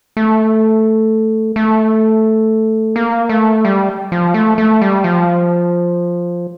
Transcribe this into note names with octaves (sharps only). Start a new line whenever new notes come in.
A3
A3
A#3
A3
G3
F3
A3
A3
G3
F3